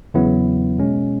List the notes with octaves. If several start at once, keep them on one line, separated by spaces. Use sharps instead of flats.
E2 C#3 F#3 B3 E4
B2 G#3 C#4